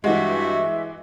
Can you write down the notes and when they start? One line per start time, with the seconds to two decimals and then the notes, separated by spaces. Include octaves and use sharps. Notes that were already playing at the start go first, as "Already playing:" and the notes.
0.04 G2 E3 G#3 F#4 E5